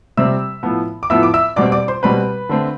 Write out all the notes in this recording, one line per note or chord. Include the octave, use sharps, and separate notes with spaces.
C3 G3 C4 E5 E6
A2 F3 B3
D6
A2 F3 B3 E5 E6
D6
E5 E6
B2 G3 C4 D5 D6
D5 D6
C5 C6
B2 G3 C4 B4 B5
D3 A3 C4